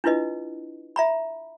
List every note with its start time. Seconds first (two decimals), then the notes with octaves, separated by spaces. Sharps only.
0.04 D4 E4 F4 B4 D#5
0.96 E5 A#5 B5